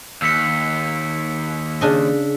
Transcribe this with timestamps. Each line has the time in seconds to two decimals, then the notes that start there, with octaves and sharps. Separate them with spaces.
0.22 D#2 E6 B6 C#7
1.81 C#3 D4 D#5